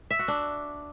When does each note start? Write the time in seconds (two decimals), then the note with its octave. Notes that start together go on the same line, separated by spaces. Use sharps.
0.10 E5
0.19 F#4
0.28 D4